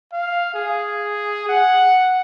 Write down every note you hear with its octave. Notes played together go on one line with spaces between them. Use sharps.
F5
G#4
F#5